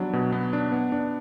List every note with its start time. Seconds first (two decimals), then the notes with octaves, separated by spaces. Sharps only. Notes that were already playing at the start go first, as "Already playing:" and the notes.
Already playing: F#3 B3 D4
0.13 B2
0.32 B3
0.53 D4
0.72 B3
0.92 D4